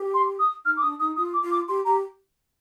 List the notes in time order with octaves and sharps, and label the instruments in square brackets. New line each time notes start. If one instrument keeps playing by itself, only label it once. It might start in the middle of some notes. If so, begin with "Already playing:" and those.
Already playing: [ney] G4
[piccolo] C6
D#6
[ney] D#4 [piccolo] F6
[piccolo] D6
[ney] D4 [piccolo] D#6
[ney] D#4 [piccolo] D#6
[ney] F4 [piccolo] D#6
[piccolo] D6
[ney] F4
[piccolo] D6
[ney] G4 [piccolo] C6
[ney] G4 [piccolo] A#5